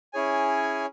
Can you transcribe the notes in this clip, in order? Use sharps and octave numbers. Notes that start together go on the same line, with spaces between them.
C#4 E4 G#4 C#5 G#5